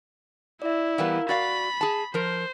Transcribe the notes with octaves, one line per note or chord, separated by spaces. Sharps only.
E4 D5 E5
E3 G3 B3 A#4 F5
F#4 D5 F5 B5 A6
G#4 A5
F3 A#4 C5